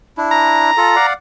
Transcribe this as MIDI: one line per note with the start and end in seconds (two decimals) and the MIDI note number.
0.17 0.71 62
0.17 0.71 64
0.31 1.06 82
0.77 0.96 65
0.77 0.96 69
0.96 1.13 74
0.96 1.13 77
0.96 1.13 78